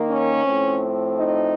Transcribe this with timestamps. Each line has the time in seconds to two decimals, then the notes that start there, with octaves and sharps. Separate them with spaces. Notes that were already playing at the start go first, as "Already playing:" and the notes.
Already playing: D#3 A#3
0.09 C#4
0.44 A2 F3 A3 C4
1.16 D#4